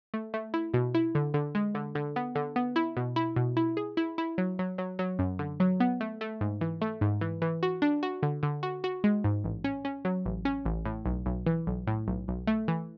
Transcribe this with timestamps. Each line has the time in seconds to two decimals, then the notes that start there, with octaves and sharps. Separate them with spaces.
0.14 A3
0.34 A3
0.54 E4
0.74 B2
0.95 E4
1.15 D3
1.34 D3
1.55 G#3
1.75 D3
1.95 D3
2.16 B3
2.35 D3
2.56 B3
2.76 E4
2.97 B2
3.16 E4
3.36 B2
3.57 E4
3.77 G#4
3.97 E4
4.18 E4
4.38 F#3
4.59 F#3
4.78 F#3
4.99 F#3
5.19 F#2
5.39 D3
5.60 F#3
5.80 B3
6.01 A3
6.21 A3
6.41 G#2
6.61 E3
6.81 A3
7.01 G#2
7.21 E3
7.42 E3
7.63 F#4
7.82 D4
8.03 F#4
8.23 D3
8.43 D3
8.63 F#4
8.84 F#4
9.04 G#3
9.24 G#2
9.44 A1
9.64 C#4
9.85 C#4
10.05 F#3
10.26 A1
10.45 C#4
10.66 A1
10.85 A2
11.06 B1
11.26 B1
11.46 E3
11.67 B1
11.87 A2
12.08 B1
12.28 B1
12.47 A3
12.68 E3